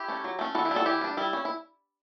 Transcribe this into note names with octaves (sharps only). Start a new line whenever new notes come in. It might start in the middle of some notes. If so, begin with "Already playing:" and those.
Already playing: E4 G4
A3 C#4
F#3
A3 C#4
E3 F#4 A4
E4 G4
G3 D4 F#4 A4
E3 E4 G4
G3 D4
G3 E4
C#4
E4